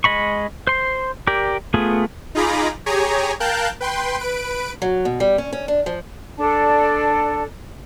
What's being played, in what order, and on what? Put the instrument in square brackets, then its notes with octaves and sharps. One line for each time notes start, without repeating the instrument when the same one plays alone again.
[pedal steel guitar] G#3 D#5 B5 C#6
C5 C6
G4 A#4 D5
A3 B3 F4 G#4
[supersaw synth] D#4 F4 G#4 A#5 B5 D6
G4 G#4 C#5 G#5 A#5
A#4 F5 G5 A5 F#6 G6
B4 G5 C6
B4 D7
[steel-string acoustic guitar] F#3
B2
G3
C#4
C#4
D4
F3
[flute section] D4 A4 D5 A5